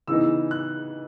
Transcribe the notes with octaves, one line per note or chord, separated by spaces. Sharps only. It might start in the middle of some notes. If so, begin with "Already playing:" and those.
C#3 E3 B3 D#4 E6
F#6